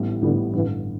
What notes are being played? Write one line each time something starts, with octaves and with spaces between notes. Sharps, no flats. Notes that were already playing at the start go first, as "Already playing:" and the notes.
Already playing: A1 A2 G3 B3
A1 A2 D3 G3 B3
A1 G2 D3 E3